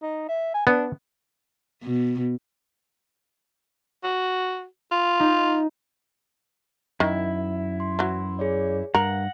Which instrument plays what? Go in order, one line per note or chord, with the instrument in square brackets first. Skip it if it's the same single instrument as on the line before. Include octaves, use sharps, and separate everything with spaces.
[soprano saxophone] D#4
E5
G#5
[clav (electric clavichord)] B3 [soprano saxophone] D4
[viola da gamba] B2
[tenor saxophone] F#4
F4
[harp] D#4
[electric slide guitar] F#2 [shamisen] D#3 [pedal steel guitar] E4
[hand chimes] C6
[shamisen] E3 F#3
[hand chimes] G#4 C#5 D5
[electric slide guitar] G2 [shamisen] A#4 [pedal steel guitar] F#5 [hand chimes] A#6